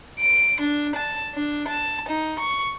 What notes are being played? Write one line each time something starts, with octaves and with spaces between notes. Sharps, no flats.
D7
D4
A5
D4
A5
D#4
C#6